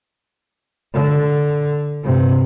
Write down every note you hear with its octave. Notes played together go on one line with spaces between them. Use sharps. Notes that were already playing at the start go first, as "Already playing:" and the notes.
D3
G2 C3